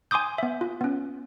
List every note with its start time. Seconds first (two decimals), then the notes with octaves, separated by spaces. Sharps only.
0.11 G#5 C6 D6 D#6 G6
0.38 B3 E5
0.61 F4
0.81 B3 C#4